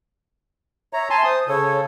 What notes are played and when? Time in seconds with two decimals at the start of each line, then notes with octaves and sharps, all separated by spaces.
0.93 C#5 E5 A#5
1.10 G#5 A5 C6
1.24 C5 D#6
1.48 C#3 A4 C#5